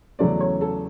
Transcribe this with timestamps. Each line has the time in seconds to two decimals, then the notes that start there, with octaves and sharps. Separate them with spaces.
0.19 E2 C#3 F#3 A3 C#4 D5
0.40 C#5
0.61 A4